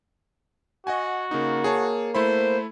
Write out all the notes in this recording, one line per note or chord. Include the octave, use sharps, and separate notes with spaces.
F#4 D#5 F#5 G#5
C#3 A#3 D#4
G#4 C#5 A5
A3 E4 C5 B5